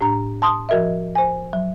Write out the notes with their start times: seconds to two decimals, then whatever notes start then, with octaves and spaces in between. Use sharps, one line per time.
0.01 A2 D4 A#5
0.42 A5 C6 D#6
0.69 F3 F#4 A#4 D#5 E5
1.15 C5 G#5
1.53 F#3